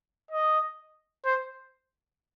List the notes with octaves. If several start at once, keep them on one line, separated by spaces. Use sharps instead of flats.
D#5
C5